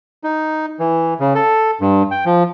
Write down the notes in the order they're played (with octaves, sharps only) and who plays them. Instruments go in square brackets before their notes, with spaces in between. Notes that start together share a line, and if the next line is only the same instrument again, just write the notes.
[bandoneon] D#4
E3
C#3
A4
G2
G5
F3